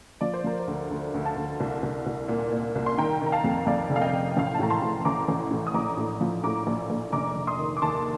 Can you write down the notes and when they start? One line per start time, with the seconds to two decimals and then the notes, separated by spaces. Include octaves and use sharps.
0.21 F3 D5
0.34 C5
0.44 F3 A#4
0.60 C5
0.67 D2
0.90 D2
1.14 D2
1.25 F5 A5
1.36 D2
1.60 C2
1.83 C2
2.06 C2
2.28 A#2
2.52 A#2
2.75 C2
2.86 C6
2.97 D#3 G5 A#5
3.21 D#3
3.26 A#5
3.32 F5 A5
3.44 F2
3.67 F2 D5 F5
3.90 F1
3.96 F5
4.01 D#5 G5
4.13 F1
4.37 A1 F5
4.47 G5
4.54 A5
4.59 A2 A#5
4.70 A5 C6
4.82 A2
5.05 A1 A#5 D6
5.28 A1
5.51 A2
5.67 D#6
5.74 A#1 A#5 D6
5.97 A2
6.21 F3
6.43 A2 A#5 D6
6.67 A#1
6.90 A#1
7.12 F1 A#5 D6
7.36 F1
7.47 C6 D#6
7.58 D#3
7.77 D6
7.82 D#2 A5 C6